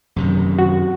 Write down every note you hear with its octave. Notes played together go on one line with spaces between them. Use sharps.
F#2 C3 D#3
F#4